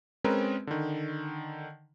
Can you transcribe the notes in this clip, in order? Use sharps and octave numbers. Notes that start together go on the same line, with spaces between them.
G#3 C4 C#4 A#4 B4
D3 D#3